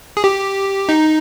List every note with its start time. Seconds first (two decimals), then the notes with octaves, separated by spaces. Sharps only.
0.17 G#4
0.24 G4
0.89 D#4